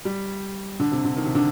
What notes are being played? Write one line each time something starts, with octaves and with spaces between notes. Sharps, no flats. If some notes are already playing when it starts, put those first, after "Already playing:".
G3
D3
C3
D3
D#3
C3
D3